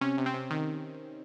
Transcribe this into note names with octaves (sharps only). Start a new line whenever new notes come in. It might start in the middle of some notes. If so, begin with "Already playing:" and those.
C3 C#4
C3
C4
C3
D#3